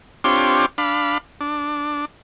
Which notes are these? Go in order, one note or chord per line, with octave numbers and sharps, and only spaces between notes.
C4 D4 F4 G4 C#5 C6
D4 F5 B5
D4